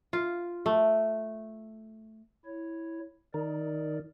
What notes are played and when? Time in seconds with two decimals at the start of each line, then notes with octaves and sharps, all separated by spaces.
0.13 F4
0.66 A3
2.45 E4 C#5
3.34 D#3 D#4 A#4 D5